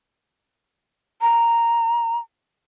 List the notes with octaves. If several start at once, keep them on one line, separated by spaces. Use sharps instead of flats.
A#5